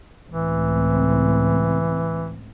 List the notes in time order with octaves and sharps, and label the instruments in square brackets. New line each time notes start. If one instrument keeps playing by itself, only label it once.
[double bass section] C#2 A2 C4 [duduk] E3